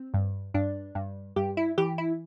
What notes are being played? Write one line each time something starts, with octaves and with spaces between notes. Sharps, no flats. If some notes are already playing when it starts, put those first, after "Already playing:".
Already playing: C4
G2
G2 D4
G2
G2 G4
E4
E3 G4
E4